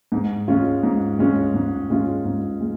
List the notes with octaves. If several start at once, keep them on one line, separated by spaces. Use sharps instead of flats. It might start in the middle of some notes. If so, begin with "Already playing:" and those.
G#2
G#3 C#4 F4
G#2
G#3 C#4 F4
G#2
G#3 C#4 F4
G#2
G#3